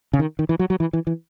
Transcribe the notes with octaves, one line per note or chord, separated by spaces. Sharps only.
C#3
D#3
D#3
E3
F#3
F#3
E3
E3
E3